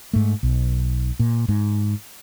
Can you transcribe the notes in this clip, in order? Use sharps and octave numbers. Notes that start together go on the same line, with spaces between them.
G#2 A3
B1
A#2
G#2